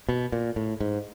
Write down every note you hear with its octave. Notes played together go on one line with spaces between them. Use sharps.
B2
A#2
A2
G#2